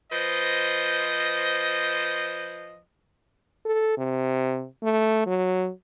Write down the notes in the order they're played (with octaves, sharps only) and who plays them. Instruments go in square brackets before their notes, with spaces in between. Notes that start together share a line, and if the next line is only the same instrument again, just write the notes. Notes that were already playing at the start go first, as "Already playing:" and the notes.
[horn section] F3 B4 C5 D#5
[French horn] A4
C3
A3
F#3